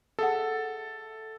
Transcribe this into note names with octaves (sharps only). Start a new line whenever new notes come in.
G#4 A4 E5 F#5